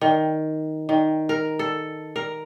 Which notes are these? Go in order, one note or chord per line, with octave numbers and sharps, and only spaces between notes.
D#3
D#3
A#4
A4
A#4